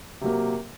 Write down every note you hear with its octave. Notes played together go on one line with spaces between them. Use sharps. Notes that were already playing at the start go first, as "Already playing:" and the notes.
C3 F#3 A#3